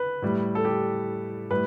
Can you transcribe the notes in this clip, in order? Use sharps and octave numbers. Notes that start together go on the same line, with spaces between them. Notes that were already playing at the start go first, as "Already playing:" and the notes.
Already playing: B4
A2 G3
A4
G4
A2 G3 B4